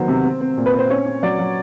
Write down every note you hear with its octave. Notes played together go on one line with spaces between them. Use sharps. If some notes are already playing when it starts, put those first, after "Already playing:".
Already playing: D3 D#3 F#3 B3 C5
C3
C4
C4
A#2
B4
C4
C5
C#4 C#5
C#4
F#3 D5
F#3